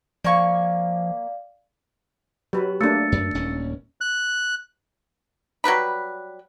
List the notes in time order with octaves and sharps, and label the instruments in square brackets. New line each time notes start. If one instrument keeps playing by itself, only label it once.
[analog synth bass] F3 [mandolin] A#3 G#5 C#6 [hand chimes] D5 F5
[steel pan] F#3 B4 [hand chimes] G4
[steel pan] A3 A#3 D4 [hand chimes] E6 A6 C#7
[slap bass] F#2
D#1 D#2 C#4
[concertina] F#6
[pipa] F#3 G3 B4 B5